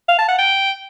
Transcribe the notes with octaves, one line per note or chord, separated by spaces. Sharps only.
F5
A5
F#5
G5